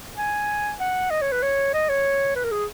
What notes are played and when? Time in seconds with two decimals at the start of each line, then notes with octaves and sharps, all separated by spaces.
0.17 G#5
0.80 F#5
1.11 D#5
1.21 C#5
1.32 B4
1.42 C#5
1.74 D#5
1.89 C#5
2.36 B4
2.44 A#4
2.51 G#4